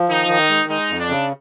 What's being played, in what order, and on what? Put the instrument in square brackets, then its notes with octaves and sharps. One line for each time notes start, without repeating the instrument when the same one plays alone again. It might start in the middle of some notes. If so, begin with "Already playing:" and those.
Already playing: [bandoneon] F3
[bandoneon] D#3 [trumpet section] D#4
[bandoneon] D#3
G#3
[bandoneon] G#3 [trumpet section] D#4
[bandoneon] F2
[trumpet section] D4
[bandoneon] C#3